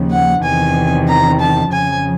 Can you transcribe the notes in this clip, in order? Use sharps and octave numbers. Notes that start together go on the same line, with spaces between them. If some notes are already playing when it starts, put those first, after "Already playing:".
Already playing: D#2 C#3 F3
F#5
E2 C3 D#3 G#5
A#5
A5
F2 C#3 F3 G#5